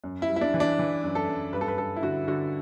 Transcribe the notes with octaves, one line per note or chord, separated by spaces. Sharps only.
F#2
E4
G3
E4
D4
E3
D4
E3
F#2
A4
F#2
G2 B4
A4
B4
G2 A4
E4
D3 F#4
D3 F#4